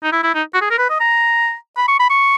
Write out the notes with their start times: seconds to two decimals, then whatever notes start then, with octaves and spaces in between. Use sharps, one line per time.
0.03 D#4
0.13 E4
0.23 E4
0.35 D#4
0.54 F#4
0.61 G#4
0.70 A#4
0.78 B4
0.90 D#5
1.00 A#5
1.77 B5
1.88 C#6
2.00 B5
2.10 C#6